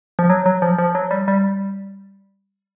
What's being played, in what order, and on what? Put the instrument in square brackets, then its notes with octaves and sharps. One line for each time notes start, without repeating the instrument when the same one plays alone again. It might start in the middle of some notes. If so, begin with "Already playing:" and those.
[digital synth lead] F3
F#3
F#3
F3
F3
F#3
G3
G3